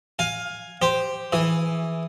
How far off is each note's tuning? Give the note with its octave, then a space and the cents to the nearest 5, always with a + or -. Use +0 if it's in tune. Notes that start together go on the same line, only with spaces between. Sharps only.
F5 +15 G#5 +0
G4 +0 C5 -5
E3 +0 G#4 +0